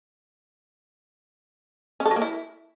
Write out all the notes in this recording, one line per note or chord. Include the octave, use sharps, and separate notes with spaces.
C#4
A4
F#3
A#3
E4